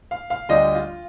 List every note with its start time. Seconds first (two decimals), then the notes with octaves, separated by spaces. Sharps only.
0.11 F5
0.30 F5
0.49 D2 D3 G3 D4 F4 D#5
0.75 F4